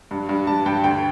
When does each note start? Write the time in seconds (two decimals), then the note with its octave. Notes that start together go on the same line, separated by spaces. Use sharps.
0.11 G2
0.29 G2
0.47 G2 A5
0.66 G2 G5
0.84 D2 G5